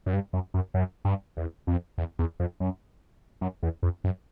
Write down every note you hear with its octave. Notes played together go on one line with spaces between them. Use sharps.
F#2
G2
F#2
F#2
F#2
G2
E2
F2
E2
E2
F2
F#2
F#2
E2
F2
F#2